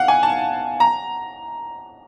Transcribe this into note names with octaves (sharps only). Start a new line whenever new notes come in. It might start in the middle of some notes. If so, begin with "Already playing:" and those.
Already playing: F5 F#5
G#5
A5
A#5